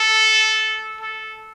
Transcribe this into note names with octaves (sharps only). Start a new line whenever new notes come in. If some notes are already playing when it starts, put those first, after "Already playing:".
Already playing: A4
A4